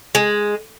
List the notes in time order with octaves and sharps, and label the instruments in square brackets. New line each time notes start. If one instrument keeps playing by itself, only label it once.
[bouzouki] G#3